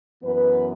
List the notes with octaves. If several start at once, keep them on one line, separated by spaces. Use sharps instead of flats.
F#2 E3 B3 B4